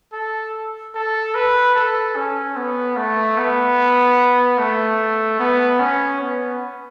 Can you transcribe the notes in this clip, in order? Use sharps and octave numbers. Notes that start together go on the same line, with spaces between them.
A4
A4
B4
A4
C#4
B3
A3
B3
A3
B3
C#4
B3